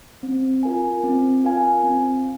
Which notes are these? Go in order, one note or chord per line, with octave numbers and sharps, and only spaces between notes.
C4
F4 A#4 F5 G#5
C4
F4 A#4 F5 G#5
C4